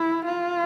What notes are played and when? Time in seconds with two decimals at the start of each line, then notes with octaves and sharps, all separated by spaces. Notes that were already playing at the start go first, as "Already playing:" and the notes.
Already playing: E4
0.25 F4